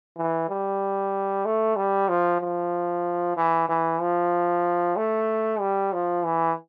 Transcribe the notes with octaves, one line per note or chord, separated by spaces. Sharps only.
E3
G3
A3
G3
F3
F3
E3
E3
F3
A3
G3
F3
E3